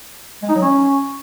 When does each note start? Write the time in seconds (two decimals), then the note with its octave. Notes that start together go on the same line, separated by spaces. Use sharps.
0.42 G#3
0.49 D#4
0.55 F#3
0.62 C#4